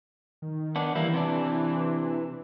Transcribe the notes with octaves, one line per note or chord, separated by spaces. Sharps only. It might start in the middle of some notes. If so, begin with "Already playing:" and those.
D#3
B3 D4
E3 G3 A#3 E4
C3 D4